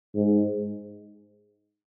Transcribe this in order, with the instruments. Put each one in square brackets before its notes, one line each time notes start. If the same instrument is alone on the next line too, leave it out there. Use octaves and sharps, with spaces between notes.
[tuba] G#2